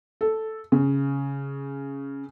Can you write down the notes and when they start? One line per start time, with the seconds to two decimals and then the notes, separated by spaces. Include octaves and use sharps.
0.21 A4
0.72 C#3